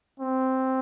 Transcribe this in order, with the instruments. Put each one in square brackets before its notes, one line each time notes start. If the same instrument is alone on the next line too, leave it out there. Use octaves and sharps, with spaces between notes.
[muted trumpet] C4